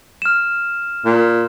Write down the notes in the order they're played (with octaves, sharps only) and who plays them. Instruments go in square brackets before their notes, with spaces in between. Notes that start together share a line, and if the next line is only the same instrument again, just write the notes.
[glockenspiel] F6 E7
[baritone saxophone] A#2